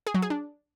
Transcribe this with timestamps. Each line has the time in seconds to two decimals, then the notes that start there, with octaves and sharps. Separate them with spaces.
0.07 G#4
0.14 F#3
0.22 G#4
0.30 D4